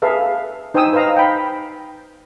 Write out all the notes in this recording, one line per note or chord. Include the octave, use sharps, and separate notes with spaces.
G#4 A4 B4 E5 F5
D#4 C5 G5 G#5 D#6 E6
B4 C5 D#5 F5 A#5
G5 B5